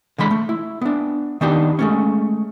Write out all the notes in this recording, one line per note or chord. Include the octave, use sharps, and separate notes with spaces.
D3 E3 G#3 B5
A3
E4
B3 D4
D#3 B3 D4 D#4 G4
G#3 A3 C#4